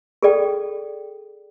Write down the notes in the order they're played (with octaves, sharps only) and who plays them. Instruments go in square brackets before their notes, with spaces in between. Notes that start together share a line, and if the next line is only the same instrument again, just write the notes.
[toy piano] G#4 A4 D5 G5